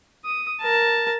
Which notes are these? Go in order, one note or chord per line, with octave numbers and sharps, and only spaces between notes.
D#6
A#4 A5